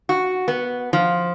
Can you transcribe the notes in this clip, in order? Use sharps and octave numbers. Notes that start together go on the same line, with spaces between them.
F#4
B3
F3